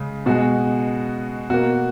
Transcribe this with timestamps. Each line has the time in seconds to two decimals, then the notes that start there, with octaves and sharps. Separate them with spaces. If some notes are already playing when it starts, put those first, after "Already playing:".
Already playing: C#3 G#3
0.26 B2 G#3 F#4
1.50 B2 A#3 F#4